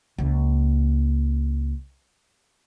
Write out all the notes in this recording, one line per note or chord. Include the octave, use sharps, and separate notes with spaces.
C#2 A#3